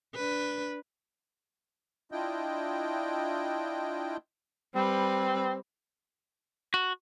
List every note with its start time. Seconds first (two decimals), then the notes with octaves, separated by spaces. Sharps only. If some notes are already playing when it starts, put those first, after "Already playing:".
0.15 D4 B4
2.12 D4 E4 F4 D#5 G5
4.75 G3 C4 B4
6.74 F#4